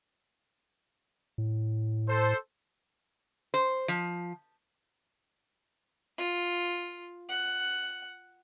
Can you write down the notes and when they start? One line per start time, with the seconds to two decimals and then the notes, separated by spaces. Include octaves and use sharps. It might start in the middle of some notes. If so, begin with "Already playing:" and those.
1.38 A2
2.09 A4 C5
3.54 C5
3.88 F3
6.18 F4
7.29 F#5